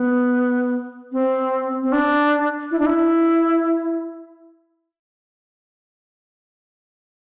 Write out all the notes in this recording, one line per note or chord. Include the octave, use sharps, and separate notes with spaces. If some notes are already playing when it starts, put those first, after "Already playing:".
Already playing: B3
C4
C4
D4
E4
D4
E4